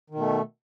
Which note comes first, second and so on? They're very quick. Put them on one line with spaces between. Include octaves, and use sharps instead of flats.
D#3 B2 A3